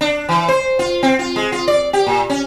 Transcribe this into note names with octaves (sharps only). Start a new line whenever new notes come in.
D4
E3
C5
F4
C4
F4
G#3
F4
D5
G4
A#2
C#4